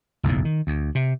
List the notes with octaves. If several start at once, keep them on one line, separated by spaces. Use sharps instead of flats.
F#1 B1 E2 A2
D#3
D2
C3